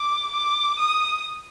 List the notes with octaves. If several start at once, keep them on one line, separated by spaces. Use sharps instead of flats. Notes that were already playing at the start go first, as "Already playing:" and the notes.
Already playing: D6
D6
D#6